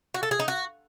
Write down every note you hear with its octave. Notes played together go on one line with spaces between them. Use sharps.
F#4
A4
G#4
D#4
F#4